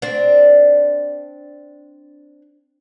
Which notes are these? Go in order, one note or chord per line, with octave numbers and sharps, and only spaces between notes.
C4 D4